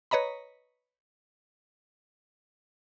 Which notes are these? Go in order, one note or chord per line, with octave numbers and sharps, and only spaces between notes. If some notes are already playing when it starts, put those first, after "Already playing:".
B4 C#5 D#5 A#5 B5